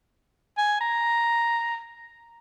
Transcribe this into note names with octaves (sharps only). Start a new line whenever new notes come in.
G#5
A#5